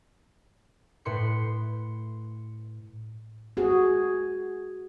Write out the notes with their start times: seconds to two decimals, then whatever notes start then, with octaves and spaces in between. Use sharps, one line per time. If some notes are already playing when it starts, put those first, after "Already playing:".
1.05 A2 B4 C6 C#7
3.57 F#4 G#4